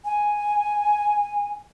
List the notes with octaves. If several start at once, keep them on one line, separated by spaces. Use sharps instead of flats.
G#5